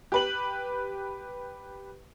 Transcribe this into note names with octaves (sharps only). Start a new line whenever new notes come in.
G4 B4 F#7